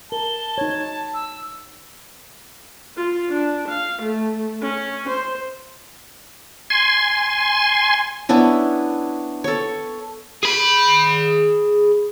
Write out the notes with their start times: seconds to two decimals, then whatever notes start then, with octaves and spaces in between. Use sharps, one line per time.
0.12 A#4 A5 G7
0.58 D#4 C#5 G#6
1.14 E6
2.97 F4
3.29 D4
3.69 F5
4.02 A3
4.62 C#4
5.09 C5
6.70 G#5 C6
8.29 B3 C#4 D4 E4
9.44 A4 C#5
10.43 G#4 B5